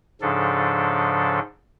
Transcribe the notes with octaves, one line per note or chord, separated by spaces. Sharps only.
G#2 C#3 F3 D4 A4